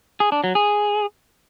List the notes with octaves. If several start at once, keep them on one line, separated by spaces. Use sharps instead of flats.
G#4
D4
F#3
G#4